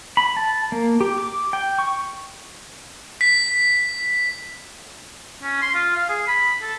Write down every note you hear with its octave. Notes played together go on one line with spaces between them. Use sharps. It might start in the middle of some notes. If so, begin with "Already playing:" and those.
B5
A5
A#3
G4
D6
G5
C#6
B6
C#4
C6
F4
F5
G#4
B5
A4